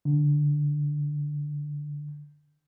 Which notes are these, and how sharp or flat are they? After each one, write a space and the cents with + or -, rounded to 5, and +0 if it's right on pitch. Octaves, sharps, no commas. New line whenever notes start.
D3 +0